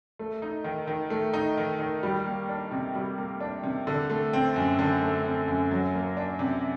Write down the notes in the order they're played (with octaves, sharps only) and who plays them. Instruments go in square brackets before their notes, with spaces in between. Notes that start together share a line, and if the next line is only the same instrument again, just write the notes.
[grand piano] A3
D#4
D#3
D#3
A3
D#4
D#3
D#3
G3
A#3
D4
C3
G3
A#3
D4
C3
D3
A3
C4
F#2
D3
A3
C4
F#2
F#3
A#3
D4
C3